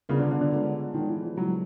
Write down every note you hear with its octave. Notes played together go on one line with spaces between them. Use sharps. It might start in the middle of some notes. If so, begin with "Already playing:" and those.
C#3 G3 B3 D4 F4 A#4
D3
D3
D3
G#3 C#4 F4 A4
A#2 D#3 F3 G#3
E3
E3
C#3 E3 F#3 G#3